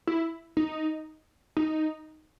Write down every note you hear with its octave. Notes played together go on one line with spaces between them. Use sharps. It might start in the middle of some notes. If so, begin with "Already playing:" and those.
E4
D#4
D#4